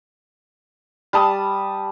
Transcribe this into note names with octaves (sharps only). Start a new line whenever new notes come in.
G3 A5 D#6